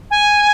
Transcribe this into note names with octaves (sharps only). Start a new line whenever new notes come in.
G#5